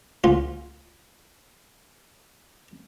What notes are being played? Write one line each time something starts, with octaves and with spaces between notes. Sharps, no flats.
C#2 F4